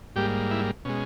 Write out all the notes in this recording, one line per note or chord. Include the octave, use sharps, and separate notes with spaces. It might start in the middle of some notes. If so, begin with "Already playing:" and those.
G#2 G3 A#3 G4
E4
B2 G#3 C#4